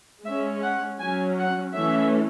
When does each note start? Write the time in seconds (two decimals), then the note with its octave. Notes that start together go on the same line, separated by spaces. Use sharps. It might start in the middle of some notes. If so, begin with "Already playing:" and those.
0.24 G#3 C#4 E5
0.63 F#5
1.00 F#3 C#4 G#5
1.38 F#5
1.75 E3 A3 C#4 E5